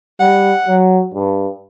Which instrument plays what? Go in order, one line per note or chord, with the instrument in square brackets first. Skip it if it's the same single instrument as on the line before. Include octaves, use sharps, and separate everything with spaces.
[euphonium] G3 [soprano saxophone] F#5
[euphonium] F#3
G2